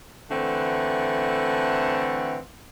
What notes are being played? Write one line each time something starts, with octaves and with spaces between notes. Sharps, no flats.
D3 E3 A3 C4 F#5